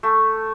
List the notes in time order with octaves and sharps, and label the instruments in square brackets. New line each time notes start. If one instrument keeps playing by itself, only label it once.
[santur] A3